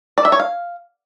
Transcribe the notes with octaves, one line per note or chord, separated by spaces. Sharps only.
D5
E5
C#5
F5